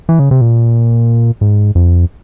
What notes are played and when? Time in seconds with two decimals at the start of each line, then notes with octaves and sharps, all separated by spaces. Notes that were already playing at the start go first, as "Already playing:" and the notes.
0.09 E3
0.19 C#3
0.31 C3
0.41 A#2
1.41 G#2
1.75 F2